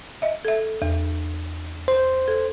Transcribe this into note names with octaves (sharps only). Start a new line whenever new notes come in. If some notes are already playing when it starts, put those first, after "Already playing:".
D#5 E5
A4 E5
E2
C5
A4